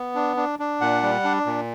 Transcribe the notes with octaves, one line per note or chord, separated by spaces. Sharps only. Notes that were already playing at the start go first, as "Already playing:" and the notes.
Already playing: B3
D4
D4
D4
A#2 F#5
G3
D4
A#2